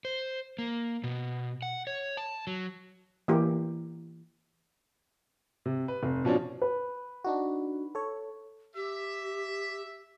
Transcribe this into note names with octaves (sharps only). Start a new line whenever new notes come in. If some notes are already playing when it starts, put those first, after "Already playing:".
C5
A#3
B2
F#5
C#5
A5
F#3
E3 A#3 G4
C3
B4
F1
B2 F3 C#4 D4
B4
D4 D#4 F#4
A4 C#5
G4 E5